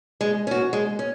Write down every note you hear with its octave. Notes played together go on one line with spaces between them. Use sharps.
G#3
C#4 F#4
G#3
C#4